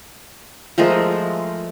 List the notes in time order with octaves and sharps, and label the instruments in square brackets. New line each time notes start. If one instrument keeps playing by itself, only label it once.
[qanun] F3 G#3 A3 A#4